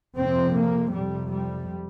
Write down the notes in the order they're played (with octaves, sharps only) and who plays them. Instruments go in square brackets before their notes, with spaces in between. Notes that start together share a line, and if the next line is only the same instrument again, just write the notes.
[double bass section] F2 C3 C4
A#3
F2 C3 G3
G3